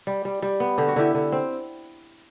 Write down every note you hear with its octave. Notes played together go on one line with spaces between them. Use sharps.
G3
G3
G3
B3
D3 G4
F#4
D3 E4 G4
D3
C4